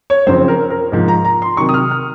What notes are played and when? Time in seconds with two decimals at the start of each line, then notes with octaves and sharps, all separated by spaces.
0.10 C#5
0.27 F#2 C#3 F3 C4 C5
0.48 A#4
0.70 A#4
0.92 G#2 F3 A#3
1.08 A#5
1.25 A#5
1.42 C6
1.57 C3 D#3 F#3 C#6
1.69 D#6
1.74 F6
1.91 F6